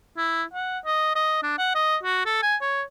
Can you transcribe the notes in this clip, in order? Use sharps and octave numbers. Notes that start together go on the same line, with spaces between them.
E4
F#5
D#5
D#5
D4
F#5
D#5
F#4
A4
G#5
C#5